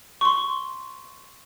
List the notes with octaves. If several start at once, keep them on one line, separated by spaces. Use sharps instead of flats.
C6 C#6